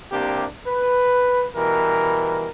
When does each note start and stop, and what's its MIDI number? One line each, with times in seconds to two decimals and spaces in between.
0.12 0.45 36
0.12 0.45 48
0.12 0.45 58
0.12 0.45 62
0.12 0.45 67
0.67 1.44 71
1.56 2.47 47
1.56 2.47 52
1.56 2.47 55
1.56 2.47 70